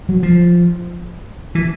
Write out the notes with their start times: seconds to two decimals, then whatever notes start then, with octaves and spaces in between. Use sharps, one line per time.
0.09 F#3
0.23 F3
1.55 E3